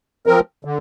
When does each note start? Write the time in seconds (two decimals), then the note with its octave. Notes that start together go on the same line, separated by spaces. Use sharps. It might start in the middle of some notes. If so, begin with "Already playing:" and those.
0.26 F3 C4 A#4
0.65 D3